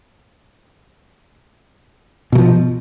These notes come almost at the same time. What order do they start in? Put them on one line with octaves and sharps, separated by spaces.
B2 F#3 F3